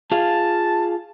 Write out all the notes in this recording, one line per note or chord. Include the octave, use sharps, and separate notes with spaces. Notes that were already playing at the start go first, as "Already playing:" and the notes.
F4 G#4 F5 A5